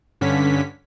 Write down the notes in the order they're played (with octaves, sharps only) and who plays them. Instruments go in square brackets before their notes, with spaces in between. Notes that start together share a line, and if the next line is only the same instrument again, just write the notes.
[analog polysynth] G2 D3 C#4 B6